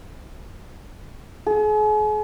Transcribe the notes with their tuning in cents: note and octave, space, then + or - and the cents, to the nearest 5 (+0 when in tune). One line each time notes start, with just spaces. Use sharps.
G#4 +40